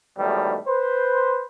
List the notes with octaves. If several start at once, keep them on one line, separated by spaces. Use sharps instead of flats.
E2 G#2 D#3 F#3 G3 A3
B4 C5